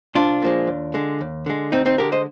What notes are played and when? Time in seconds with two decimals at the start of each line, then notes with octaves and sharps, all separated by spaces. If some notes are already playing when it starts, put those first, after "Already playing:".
0.15 C2 D4 F4
0.42 A#2 F3 G#3
0.67 D#2
0.94 D3 G#3
1.21 D#2
1.46 D3 G#3
1.72 D2 C4 D#4
1.86 C4 D#4
1.98 D3 G#3 G4 A#4
2.12 C5 D#5